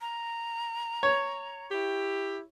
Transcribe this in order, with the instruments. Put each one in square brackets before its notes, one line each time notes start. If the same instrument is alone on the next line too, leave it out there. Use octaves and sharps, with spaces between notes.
[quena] A#5
[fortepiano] C#5
[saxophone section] E4 G4